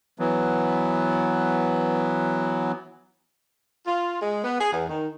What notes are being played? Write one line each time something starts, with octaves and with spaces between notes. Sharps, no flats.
E3 F#3 B3
F4
G#3
B3
G#4
E2
D#3